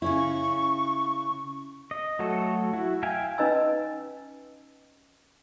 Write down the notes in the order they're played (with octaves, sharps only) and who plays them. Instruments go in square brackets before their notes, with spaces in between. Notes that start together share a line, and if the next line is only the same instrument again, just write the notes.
[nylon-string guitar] C#3 C#4 E4 [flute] C#6
[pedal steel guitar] D#5
F#3 A3 F#4 A4
E4 F#4
E5 F5 G5 G#5
[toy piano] C#4 D#4 B4 D#5 G#5 E6